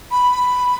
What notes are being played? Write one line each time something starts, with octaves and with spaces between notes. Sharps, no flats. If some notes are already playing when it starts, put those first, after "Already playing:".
B5